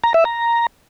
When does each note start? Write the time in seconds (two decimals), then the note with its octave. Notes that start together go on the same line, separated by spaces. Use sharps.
0.04 A#5
0.14 E5
0.25 A#5